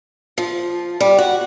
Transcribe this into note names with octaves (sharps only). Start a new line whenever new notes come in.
F3
G3
F#4